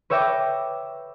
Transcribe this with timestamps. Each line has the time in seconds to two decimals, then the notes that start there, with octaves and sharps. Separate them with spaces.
0.10 B4 C#5 E5 G5 D6 A#6